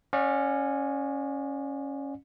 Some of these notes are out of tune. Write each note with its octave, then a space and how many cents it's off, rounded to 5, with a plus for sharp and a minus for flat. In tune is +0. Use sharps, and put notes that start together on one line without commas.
C#4 -5 D5 +30 F#5 -40